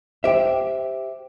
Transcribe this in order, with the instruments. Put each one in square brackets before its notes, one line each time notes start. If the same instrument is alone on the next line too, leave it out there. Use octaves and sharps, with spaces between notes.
[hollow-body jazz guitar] G4 E5 [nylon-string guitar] C5 G5